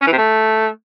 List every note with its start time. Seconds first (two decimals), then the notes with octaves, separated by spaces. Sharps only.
0.02 C#4
0.07 E3
0.13 C3
0.18 A3